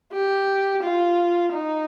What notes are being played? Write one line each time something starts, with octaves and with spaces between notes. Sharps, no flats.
G4
F4
D#4